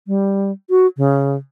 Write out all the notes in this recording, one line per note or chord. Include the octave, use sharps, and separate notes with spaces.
G3
F#4
C#3